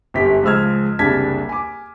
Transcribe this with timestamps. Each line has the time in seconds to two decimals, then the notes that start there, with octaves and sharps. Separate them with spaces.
0.14 G1 F#2 G4 B6
0.43 C#2 F3 G#3 E6 F6 G#6
0.99 F#1 C2 D4 A5 G#6 B6
1.49 G#5 D6